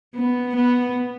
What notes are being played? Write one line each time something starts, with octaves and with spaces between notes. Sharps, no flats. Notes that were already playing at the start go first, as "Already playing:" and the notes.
B3
B3